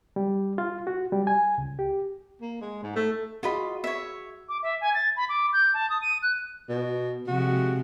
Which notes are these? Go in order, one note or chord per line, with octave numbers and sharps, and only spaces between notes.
G3
F4
F#4
G3
G#5
C#2
G4
A#3
G#3
G#2
A3
F4 F#4 G#4 D#5 B5
C#5 E5
D6
E5
G#5
A6
B5
D6
G6
A5
D#6
D#7
F#6
B2
C3 F3 G#3 F#4